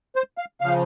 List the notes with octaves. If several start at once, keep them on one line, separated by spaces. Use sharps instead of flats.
C5
F5
C#3 F3 F5